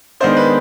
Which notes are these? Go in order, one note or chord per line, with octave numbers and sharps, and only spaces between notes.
D#3 G#3 B3 D4 C5
B4